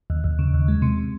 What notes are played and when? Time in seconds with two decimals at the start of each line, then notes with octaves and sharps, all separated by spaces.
0.10 D#2
0.24 D#2
0.39 C#3
0.54 D#2
0.68 G#3
0.82 C3